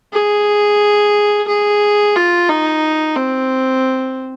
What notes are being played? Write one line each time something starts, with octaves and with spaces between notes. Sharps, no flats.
G#4
G#4
F4
D#4
C4